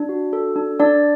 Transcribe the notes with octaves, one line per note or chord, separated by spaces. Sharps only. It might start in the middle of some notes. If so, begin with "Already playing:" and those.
Already playing: D4
F#4
A4
D4
D4 D5